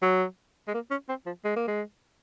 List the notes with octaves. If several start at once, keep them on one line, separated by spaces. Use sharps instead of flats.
F#3
G#3
A#3
C#4
C4
F3
G#3
A#3
G#3